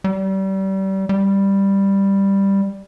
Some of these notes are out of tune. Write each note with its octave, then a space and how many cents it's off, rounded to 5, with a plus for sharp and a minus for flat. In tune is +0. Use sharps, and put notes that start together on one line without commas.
G3 -30
G3 +5